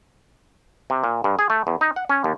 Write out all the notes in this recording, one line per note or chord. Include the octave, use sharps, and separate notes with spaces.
C3
A#2
G2
G#4
A3
E2
D#4
F#5
C#4
D#2